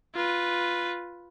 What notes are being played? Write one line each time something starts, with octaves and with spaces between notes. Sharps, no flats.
F4 B4